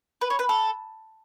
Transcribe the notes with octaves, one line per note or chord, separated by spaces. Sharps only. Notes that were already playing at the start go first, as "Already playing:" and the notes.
B4
C#5
B4
A4